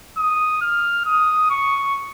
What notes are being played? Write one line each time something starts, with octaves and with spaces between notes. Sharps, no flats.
D#6
F6
D#6
C#6